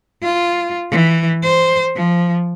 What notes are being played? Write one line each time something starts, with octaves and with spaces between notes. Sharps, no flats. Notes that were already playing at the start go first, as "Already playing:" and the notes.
F4
E3
C5
F3